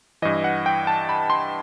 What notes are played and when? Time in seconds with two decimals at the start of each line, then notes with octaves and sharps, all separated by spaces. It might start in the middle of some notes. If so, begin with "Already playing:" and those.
0.22 G2 E3 D#5
0.44 F#5
0.66 G5
0.87 A5
1.09 B5
1.30 C6